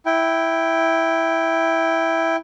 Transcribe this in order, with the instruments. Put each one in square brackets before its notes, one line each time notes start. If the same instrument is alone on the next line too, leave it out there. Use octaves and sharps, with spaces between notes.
[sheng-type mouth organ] E4 G5